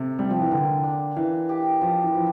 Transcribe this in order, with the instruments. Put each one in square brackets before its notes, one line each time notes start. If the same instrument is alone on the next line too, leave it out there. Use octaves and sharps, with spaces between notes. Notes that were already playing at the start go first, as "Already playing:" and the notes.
Already playing: [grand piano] C3 [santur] A4
[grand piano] G3 [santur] C4
[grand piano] F3
E3
[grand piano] D3 [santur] A#3
[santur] D4
[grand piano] E3 [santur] F5
[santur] G4
[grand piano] F3 [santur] C5
[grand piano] E3
[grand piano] F3 [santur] E4